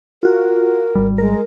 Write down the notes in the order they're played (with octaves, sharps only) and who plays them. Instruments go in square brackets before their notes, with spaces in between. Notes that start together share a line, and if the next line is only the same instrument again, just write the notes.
[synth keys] F4 F#4 [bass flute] A#4
[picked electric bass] G#1 G3
[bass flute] G#3 [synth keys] A#4